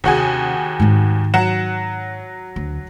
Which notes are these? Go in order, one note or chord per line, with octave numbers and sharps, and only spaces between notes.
D#2 C3 C#4 F#4 G#4
G#2 D#3
F#3 F#5 E7
D2